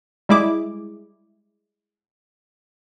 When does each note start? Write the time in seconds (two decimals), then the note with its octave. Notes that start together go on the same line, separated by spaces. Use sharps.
0.29 G3 G#3 E4 G#4 D6